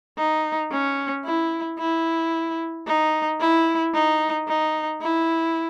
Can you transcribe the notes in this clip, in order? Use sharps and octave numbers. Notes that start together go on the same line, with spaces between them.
D#4
C#4
E4
E4
D#4
E4
D#4
D#4
E4